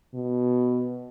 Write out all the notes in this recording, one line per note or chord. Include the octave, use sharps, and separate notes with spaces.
B2